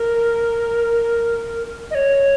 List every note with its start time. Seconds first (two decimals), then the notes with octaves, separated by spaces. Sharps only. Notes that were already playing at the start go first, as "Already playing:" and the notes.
Already playing: A#4
1.91 D#5
1.95 C#5